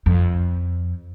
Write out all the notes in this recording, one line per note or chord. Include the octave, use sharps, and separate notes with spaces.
F2